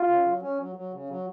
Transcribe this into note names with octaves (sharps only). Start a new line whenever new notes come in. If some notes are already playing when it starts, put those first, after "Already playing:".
Already playing: F4
C#3
F#3
C#4
F#3
F#3
C#3
F#3